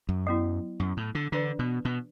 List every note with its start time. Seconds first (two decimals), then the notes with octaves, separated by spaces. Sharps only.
0.09 F#2
0.27 F#3 B3 E4
0.80 F#2
0.97 A2
1.15 D3
1.32 D3 E3 D4 B4 D5
1.59 B2
1.85 B2